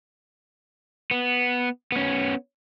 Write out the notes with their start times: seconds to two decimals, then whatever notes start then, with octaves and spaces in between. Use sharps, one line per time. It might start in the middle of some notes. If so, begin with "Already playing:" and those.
1.11 B3
1.92 B3 C#4